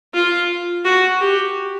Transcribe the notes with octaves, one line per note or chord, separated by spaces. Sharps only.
F4
F#4
G4